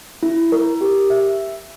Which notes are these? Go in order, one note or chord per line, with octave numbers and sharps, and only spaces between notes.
E4
A#4
G4
E5